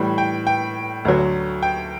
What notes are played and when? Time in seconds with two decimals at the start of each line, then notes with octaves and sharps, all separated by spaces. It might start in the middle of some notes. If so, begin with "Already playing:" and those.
Already playing: A2 E3 G3
0.18 G5
0.47 G5
1.05 D2 D3 F#3
1.63 G5